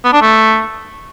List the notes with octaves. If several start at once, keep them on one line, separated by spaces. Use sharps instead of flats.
B3
D4
A3